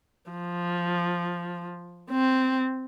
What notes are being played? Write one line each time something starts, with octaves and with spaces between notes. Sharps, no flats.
F3
C4